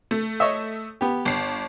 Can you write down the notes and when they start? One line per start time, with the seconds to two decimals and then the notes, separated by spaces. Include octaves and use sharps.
0.11 A3
0.40 C#5 D#5 E5
1.01 B3 G4
1.25 G1 C7